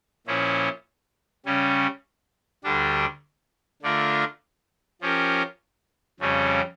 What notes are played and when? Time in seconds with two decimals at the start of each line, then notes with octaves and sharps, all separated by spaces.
0.27 A#2 F3 C#4 E4
1.46 C#3 G3 C#4
2.64 D2 D3 G3 D4
3.82 D3 A3 D4 F4 A#4
5.01 F3 C#4 G4 A#4
6.20 F2 C#3 G3 C#4